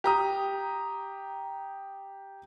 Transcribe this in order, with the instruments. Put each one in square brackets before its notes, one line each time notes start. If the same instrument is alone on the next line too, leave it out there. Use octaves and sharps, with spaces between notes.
[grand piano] G4 A#5 D#6